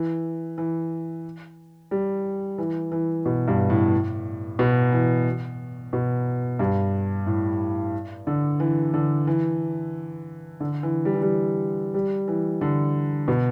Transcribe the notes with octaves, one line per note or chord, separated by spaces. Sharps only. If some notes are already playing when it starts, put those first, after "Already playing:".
Already playing: E3
E3
G3
E3
E3
B2
G2
A2
B2
E3
B2
G2
A2
D3
E3
D3
E3
D3
E3
G3
E3
G3
G3
E3
D3
B2